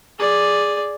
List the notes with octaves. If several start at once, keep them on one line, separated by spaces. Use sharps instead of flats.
G#4 D5